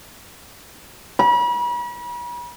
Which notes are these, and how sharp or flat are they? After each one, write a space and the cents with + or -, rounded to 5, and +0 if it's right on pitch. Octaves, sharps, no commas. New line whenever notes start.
B5 -40